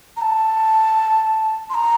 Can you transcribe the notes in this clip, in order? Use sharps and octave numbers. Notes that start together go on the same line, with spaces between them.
A#5
A5
C6
A#5